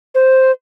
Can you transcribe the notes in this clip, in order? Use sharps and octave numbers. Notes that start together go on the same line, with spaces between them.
C5